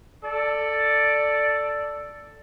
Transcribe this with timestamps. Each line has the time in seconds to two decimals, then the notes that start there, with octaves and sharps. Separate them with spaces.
0.24 A4 D5